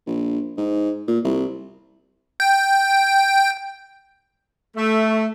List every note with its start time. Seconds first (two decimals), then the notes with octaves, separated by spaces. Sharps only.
0.07 A#1
0.57 G#2
1.08 A#2
1.24 C2
2.40 G5
4.76 A3